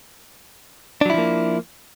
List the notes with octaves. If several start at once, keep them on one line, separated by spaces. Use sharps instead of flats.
F3 F#3 A#3 D4 E4